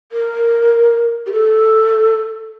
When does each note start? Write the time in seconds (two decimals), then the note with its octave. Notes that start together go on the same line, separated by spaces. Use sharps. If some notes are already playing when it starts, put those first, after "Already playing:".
0.12 A#4
1.26 G4
1.32 A4